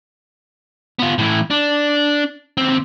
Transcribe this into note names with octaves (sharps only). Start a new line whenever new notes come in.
B3 F4
A2 E3
D4
D#2 C4